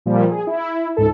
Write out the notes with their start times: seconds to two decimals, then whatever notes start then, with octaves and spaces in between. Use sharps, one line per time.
0.06 A#2 F3 G3
0.31 G#4
0.47 E4
0.97 C#2 G#2 A4